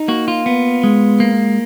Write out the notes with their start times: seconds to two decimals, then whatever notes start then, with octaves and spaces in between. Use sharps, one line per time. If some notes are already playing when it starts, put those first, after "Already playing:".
Already playing: D#4
0.08 A#3 F#4
0.28 F4
0.46 B3
0.83 G#3
1.20 A#3